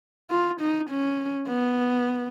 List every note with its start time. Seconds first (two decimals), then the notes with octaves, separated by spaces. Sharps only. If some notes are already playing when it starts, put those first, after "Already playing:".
0.31 F4
0.61 D#4
0.90 C#4
1.48 B3